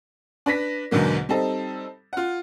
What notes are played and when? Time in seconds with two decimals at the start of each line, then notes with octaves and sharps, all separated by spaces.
0.46 D4 B4 A#6 B6
0.91 E2 G#2 B2 D3 F#3 A#3
1.29 G3 C4 D#4 A4
2.13 F4 F#5